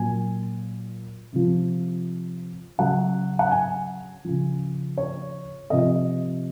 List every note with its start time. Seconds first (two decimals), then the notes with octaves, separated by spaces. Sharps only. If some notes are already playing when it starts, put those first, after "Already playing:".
Already playing: A#2 F#3 G#5
1.33 C3 F3
2.78 C#3 F#3 F#5
3.39 F#5
3.51 G#5
4.24 C#3 F3
4.97 C#5
5.70 C3 F3 D#5